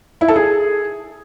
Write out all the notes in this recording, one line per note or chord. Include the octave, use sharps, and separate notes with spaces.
E4
A4
G#4